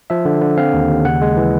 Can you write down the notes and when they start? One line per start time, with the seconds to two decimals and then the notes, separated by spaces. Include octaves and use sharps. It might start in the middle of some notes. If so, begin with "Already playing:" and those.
0.10 F3 E5
0.25 D3
0.42 D3
0.57 C4 F5
0.74 D#2
0.90 D#2
1.05 C#3 F#5
1.22 G#3
1.37 E3